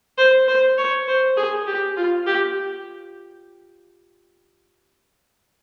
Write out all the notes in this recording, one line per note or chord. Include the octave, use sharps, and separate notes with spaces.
C5
C5
C#5
C5
G#4
G4
F4
G4